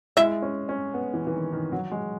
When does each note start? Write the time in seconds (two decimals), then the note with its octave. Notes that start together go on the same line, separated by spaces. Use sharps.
0.17 G#3 E4 E5
0.42 C#4
0.69 C#4
0.94 B3
1.14 E3
1.27 E3
1.34 D#3
1.53 D#3
1.72 F#3
1.91 G#3